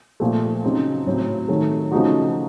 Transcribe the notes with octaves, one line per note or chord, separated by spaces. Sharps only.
A#2 F3 A3
C#3 F#3 C4 D#4
A2 F#3 C4
D#3 F#3 A3
C#3 F3 A3 D#4 F#4